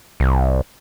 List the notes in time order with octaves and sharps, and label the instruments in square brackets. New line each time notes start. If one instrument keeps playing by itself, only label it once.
[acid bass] C2